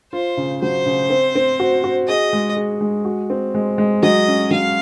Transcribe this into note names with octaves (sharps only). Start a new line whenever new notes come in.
F4 C5
C#3
F#3 C5
C#3
C4
C4
F#4
F#4
G#4 D#5
G#3
G#4
G#3
F#4
C4
G#3
G#3
F#3 D#5
C#4
F#3 F5